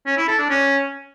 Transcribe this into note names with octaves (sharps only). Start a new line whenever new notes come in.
C#4
E4
A4
D4
C#4